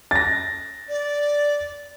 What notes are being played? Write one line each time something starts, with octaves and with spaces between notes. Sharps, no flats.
A6 A#6
D5